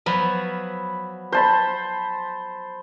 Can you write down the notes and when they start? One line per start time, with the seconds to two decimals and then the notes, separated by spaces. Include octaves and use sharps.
0.06 F3 F#3 B3 B5
1.32 C5 A5 B5